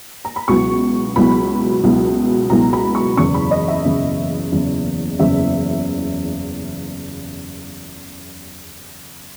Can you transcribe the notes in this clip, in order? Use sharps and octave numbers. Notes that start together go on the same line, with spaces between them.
A#5
B5
C#2 B2 F#3 B3 E4 C#6
C#2 B2 F#3 B3 E4 B5
C#2 B2 F#3 B3 E4
C#2 B2 F#3 B3 E4 A#5
B5
C#6
F#1 E2 C#3 C#6
B5
D#5
E5
F#1 E2 C#3
F#1 E2 C#3
F#1 E2 C#3 E5